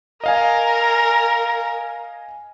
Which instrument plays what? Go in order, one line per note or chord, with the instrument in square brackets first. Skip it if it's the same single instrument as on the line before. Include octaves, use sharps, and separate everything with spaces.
[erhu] A#4 [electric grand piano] D#5 F5 G#5